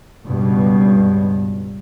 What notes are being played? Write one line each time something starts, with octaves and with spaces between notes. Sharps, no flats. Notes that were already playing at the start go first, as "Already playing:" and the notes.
C#2 G2 B2